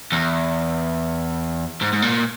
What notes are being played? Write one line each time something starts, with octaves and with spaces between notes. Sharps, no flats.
E2
G#2
G#2
A#2